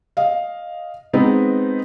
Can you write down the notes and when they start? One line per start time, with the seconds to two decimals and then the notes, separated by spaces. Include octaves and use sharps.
0.17 D#5 F5
1.13 G#3 B3 C4 D#4 B4 D#5